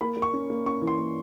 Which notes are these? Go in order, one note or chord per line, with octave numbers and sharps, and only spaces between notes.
A#3 B5
A#3
C#6
C#4
A#3
C#4 C#6
E3
C6
A#3